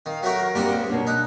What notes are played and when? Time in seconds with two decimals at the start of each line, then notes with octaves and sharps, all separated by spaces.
0.06 D#3 F5
0.23 F#3 A3 F#4 A#4
0.55 G3 A#3 C4 D4 F#5 D#6
0.72 C#2
0.89 B2 A#3 D4 C#5
1.07 D#4 F#6